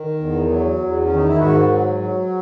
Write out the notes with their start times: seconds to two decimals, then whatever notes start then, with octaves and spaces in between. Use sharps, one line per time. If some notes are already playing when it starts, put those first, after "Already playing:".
Already playing: D#3
0.19 E2
0.49 F#3
0.79 E2
1.05 D#3 C#4
1.16 D#4
1.28 E4
1.38 G#2 F#4
1.69 F#3
1.99 F#3